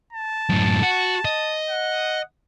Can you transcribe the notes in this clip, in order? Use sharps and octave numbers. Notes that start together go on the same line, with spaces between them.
A5
F#2 A2
F#4
D#5
F#5